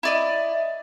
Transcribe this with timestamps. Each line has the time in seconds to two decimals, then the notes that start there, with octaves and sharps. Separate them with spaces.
0.03 E4 D5 D#5